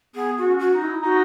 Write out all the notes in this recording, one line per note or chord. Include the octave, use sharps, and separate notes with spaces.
B3 G#4
F#4
C#4
F#4
D#4
E4
D#4 F#4